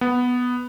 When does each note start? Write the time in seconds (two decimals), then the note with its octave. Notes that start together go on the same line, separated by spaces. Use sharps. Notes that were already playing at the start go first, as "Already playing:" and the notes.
0.01 B3